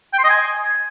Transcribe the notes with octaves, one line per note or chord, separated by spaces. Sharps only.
G5
C6
D#5
G#5